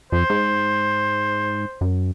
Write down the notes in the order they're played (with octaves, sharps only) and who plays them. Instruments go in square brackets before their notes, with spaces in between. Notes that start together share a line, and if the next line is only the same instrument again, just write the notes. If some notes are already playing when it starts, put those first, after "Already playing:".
[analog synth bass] F2 [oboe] C5
[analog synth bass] G#2
F#2